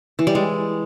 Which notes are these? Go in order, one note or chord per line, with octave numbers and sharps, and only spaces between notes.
E3
G3
G#3